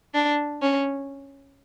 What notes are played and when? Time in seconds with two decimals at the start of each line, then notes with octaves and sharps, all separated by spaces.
0.14 D4
0.62 C#4